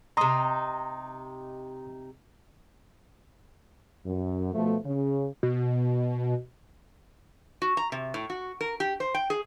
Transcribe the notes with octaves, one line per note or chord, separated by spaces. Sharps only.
C3 D#4 A#5 C6 D#6
F#2
B2 F3 A3
C#3
B2
F#4
A#5
C3
A2
F#4
A#4
G4
C5
G5
G#4